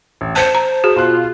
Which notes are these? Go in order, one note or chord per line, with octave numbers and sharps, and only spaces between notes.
A1
C5 A5 C#7
A#5
F#4 G#4
B2 F4 C6 F#6